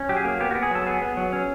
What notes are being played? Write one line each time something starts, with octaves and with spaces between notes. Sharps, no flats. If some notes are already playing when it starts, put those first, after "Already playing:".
Already playing: C#4
F#3 G4
G#4
A#3
B3 G4
F#4
B3
G#4
F#3 A4
B3 G#4
B3
F#3
C#4